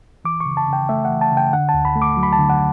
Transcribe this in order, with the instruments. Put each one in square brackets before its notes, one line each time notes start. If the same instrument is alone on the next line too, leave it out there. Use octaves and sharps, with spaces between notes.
[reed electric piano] E3 D6
C#6
C#3
A5
C#3 G5
A3 E5
F#5
E3
A5
C#3
G5
D3 F#5
A5
D2
B5
A3
D6
F#3
B5
A5
D3
F#5